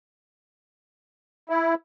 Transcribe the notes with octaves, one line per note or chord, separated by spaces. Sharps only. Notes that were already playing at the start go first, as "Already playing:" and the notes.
E4